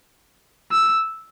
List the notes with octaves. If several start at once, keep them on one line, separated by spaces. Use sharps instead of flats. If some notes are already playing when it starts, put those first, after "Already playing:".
E6